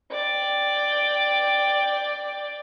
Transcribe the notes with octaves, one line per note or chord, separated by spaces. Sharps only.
D5 G5